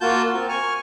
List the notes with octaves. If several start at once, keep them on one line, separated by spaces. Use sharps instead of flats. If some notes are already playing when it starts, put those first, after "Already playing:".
A#3 F4 F#4 A5 G6
C4 A#4
G#5 C#6 F6